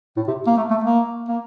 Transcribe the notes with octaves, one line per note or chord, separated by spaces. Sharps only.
A2
C3
A#3
A3
A3
A#3
A#3